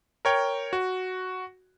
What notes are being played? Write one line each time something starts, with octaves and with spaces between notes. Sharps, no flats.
A#4 C#5 G5
F#4